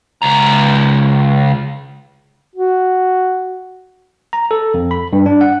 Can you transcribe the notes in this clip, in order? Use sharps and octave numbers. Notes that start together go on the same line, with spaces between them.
C#2 A#5
F#4
A#5
A4
F2
B5
G2
D4
F#5